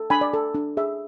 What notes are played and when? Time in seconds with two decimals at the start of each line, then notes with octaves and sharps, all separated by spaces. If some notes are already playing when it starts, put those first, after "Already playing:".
Already playing: A4
0.10 D4 G#5 B5
0.21 D5
0.33 A4
0.54 D4
0.77 G#4 E5